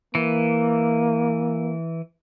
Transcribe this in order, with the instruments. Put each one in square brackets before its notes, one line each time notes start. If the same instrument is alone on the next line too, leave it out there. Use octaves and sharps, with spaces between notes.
[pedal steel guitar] E3 [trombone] A#3